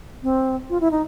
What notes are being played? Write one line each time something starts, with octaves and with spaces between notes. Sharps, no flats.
C4
F4
E4
D#4